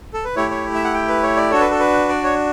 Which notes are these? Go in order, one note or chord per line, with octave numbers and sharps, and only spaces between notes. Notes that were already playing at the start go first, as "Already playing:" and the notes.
A4
B4
A3 E4 G4 C#5
C#5
E5
F#5
G5
B4
C#5
D5
D4 F#4 A4 C#5
B4
A4
B4
D5
C#5